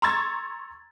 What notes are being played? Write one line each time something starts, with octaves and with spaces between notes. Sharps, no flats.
A#5 C6 C#6 E6 G#6 A6